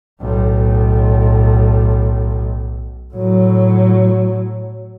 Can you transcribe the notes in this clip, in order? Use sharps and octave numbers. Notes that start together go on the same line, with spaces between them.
B1 A2
A2 F#3